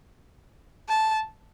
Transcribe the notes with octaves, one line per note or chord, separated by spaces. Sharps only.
A5